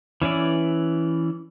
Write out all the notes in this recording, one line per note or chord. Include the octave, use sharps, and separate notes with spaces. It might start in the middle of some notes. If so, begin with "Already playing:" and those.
E3 C#4 E4 D5